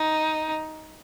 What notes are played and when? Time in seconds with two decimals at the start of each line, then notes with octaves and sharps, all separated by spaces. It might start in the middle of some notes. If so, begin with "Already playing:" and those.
Already playing: D#4